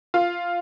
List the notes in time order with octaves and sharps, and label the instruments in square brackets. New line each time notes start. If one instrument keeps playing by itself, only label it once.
[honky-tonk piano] F4